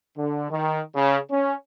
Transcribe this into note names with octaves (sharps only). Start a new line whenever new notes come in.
D3
D#3
C#3
C#4